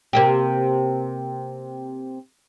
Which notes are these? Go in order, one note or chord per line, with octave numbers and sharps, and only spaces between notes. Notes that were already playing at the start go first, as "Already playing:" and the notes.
C3 A#3 G4